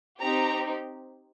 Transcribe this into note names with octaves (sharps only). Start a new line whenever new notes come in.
C4 D#4 G4 A#5